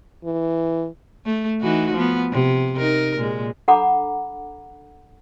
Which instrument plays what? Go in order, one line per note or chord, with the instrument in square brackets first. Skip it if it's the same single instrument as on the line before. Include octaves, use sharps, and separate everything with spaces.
[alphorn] E3
[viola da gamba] A3
E3 D#4 F#4
F3 B3
C3
D#4 A#4
A#2 G#3
[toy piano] D4 A4 F#5 A#5 B5 D6